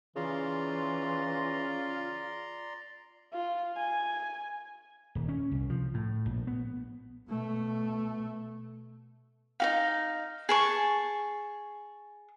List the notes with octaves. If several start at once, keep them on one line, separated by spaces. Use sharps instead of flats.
C#3 E3 F4 D5 A#5 C6
F4
G#5
D#1
C#4
C2
F3
A2
A#1
B3
B2 A3
D#4 F#4 F5
G#4 A5 C#6